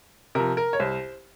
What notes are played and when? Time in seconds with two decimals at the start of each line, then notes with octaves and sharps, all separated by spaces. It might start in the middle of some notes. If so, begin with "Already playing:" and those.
0.35 C3 F3 A#4
0.57 A#4
0.73 C#5
0.80 C2 C5